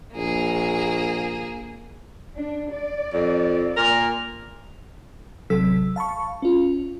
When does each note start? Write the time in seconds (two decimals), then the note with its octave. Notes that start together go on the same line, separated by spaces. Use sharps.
0.16 A#1 A#3 G#4
2.35 D4
2.73 D5
3.12 F2
3.77 A#2 A#4
5.50 A1 C3 F#3 A4 E6 B6
5.96 F5 A5 B5 C#6
6.42 C#4 F4